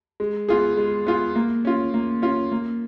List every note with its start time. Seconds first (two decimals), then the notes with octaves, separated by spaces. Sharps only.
0.20 G#3
0.49 B3 F4 G#4
0.77 G#3
1.07 B3 F4 G#4
1.36 A#3
1.65 C#4 F4
1.94 A#3
2.22 C#4 F4
2.52 A#3